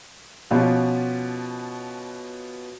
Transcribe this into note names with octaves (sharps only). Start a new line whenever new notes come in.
B2 F3 B3 C#4 F4 G4